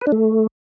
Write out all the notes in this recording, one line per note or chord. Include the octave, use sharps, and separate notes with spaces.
B4
D4
A3